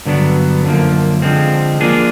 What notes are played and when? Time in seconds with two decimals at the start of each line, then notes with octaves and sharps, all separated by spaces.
0.05 G2 D3 F#3 B3 D4
0.64 F#2 D3 F3 A#3
1.22 D3 F3 G#3 C4
1.80 F3 A#3 D4 F4 G#4